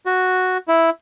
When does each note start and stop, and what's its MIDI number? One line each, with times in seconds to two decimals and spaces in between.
0.06 0.58 66
0.68 0.90 64